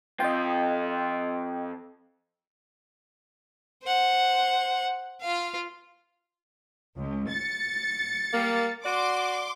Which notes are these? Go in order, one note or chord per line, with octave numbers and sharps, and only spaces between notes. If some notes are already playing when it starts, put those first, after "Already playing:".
F2 F4 D#5 G5
C5 F#5
F4 F5
C#2
A6 C#7
G3 A#3
F#4 D5 C6 D6